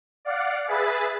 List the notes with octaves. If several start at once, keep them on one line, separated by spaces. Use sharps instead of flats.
D5 F5 F#5
G#4 B4 E5 B5 A6